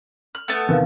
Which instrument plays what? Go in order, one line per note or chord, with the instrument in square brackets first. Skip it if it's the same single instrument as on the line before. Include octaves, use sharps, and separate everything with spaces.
[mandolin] F6 [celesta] F#7
[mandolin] A3 B3 A5
[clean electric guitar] E2 C3 D#3 [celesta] A#4 B4 F5